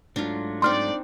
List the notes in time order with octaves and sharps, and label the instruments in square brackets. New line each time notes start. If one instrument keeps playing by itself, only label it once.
[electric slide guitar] G#2 F#3 A3 [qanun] D4 F4
[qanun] C4 D4 D#4 [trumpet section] D5 [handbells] C6 F6